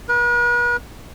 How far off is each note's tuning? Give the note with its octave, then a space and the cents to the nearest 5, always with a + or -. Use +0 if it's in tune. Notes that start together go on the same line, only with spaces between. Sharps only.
B4 -45